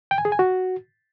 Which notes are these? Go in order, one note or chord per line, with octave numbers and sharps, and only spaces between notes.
G5
G#5
G#4
G#5
F#4